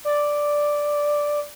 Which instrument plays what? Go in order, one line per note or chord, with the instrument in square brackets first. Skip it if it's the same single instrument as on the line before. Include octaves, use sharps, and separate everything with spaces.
[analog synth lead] D5